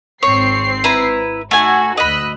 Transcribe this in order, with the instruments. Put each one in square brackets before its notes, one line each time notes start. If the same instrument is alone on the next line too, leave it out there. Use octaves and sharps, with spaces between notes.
[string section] G#1 C4 C7 [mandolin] C#5
[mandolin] E4 B4 A#5
[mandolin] A3 G#5 [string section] D#4 F#4
[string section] D2 E6 F#6 [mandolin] D#5 B5